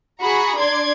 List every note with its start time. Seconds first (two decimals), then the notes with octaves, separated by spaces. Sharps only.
0.20 F#4 G#4 A#5 B5 C#6
0.57 D4 D5 C6 G#6